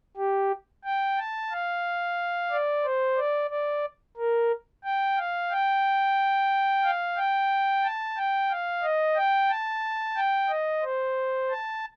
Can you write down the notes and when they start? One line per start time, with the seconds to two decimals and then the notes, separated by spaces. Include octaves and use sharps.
0.17 G4
0.84 G5
1.18 A5
1.52 F5
2.51 D5
2.85 C5
3.17 D5
3.50 D5
4.17 A#4
4.84 G5
5.18 F5
5.51 G5
6.84 F5
7.17 G5
7.83 A5
8.17 G5
8.51 F5
8.83 D#5
9.16 G5
9.50 A5
10.16 G5
10.49 D#5
10.83 C5
11.50 A5